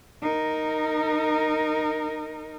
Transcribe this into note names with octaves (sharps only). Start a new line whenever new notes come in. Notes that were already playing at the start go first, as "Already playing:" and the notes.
D#4 A#4